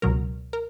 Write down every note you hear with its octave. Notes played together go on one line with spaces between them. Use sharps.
C#2 B2 F#3 A#4
A#4